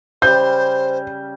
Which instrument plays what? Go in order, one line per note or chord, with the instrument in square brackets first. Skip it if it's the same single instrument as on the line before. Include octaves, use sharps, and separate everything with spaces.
[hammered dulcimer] C#3 G3 [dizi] C5 [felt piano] G6